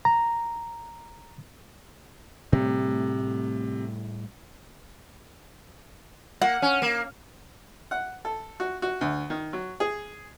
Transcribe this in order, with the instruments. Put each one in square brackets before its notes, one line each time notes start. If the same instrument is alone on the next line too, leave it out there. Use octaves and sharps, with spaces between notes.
[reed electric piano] A#5
[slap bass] A2 G3 A3 [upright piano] C3
[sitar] A#3 [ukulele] F#5
[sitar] C#4
A#3
[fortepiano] F#5
A4
F#4
F#4
D2
D#3
F#3
G#4